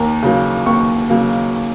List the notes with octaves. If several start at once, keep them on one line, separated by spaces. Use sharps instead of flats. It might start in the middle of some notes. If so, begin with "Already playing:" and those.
Already playing: D#2 A#5
C#3 F#3 A#3
D#2 C#6
C#3 F#3 A#3